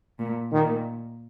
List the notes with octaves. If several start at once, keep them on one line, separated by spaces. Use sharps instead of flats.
A#2
A#2 D#3